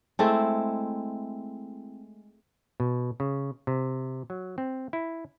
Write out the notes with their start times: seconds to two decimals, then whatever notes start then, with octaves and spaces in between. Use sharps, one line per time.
0.19 G#3 A3 C4 E4
2.80 B2
3.20 C#3
3.67 C3
4.30 F#3
4.58 C4
4.93 E4